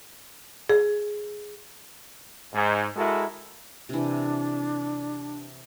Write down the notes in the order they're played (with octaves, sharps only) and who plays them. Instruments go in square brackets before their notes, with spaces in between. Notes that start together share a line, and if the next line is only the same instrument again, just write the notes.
[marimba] G#4
[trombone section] G#2
G#3 E4 F#4 A4 A#4
[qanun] C3 E3 [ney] D4